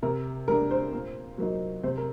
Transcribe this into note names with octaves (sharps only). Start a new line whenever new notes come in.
C3 A#4
G3 D4 A#4
C5
A#2
F#3 A#3 D#4
C3 C5
A#4